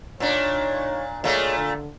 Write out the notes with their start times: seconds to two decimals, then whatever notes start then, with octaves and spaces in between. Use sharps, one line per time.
0.20 A#2 D4 D#4 C#5
1.24 A#2 A3 G#4 C#5 D#5
1.57 D3